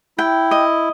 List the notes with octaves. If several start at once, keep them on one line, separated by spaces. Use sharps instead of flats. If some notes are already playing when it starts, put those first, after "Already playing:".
E4 G5
D#5